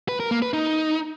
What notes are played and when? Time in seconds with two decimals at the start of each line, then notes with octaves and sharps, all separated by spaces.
0.09 B4
0.20 A#4
0.31 A#3
0.42 B4
0.53 D#4